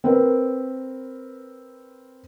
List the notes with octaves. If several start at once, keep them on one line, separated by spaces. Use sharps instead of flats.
C4 A#4 B4